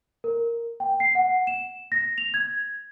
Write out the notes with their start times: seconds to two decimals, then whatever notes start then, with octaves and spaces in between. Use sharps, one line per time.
0.24 A#4
0.80 G5
1.00 C7
1.15 F#5
1.47 E7
1.92 A#6
2.18 F7
2.34 G#6